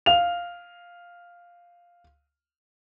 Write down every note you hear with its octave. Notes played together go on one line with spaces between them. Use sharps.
F5 F7